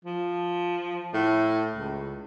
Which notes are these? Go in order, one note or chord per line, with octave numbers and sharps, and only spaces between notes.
F3
A2
C#2